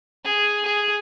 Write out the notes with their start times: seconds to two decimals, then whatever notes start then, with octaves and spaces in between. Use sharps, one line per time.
0.24 G#4
0.65 G#4